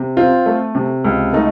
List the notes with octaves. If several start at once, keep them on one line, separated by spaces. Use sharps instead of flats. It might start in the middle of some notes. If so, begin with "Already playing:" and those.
Already playing: C3
C4 F4
A3
C3
C#2
A3 D#4